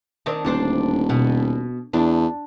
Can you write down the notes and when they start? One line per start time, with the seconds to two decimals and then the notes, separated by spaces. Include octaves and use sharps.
0.26 D#3 C4 D4
0.45 D#1 D2 D4 C5
1.09 B2
1.93 E2 D4